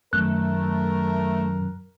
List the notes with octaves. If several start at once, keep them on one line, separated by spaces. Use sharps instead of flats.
F#2 D#3 A3 A#4 F#6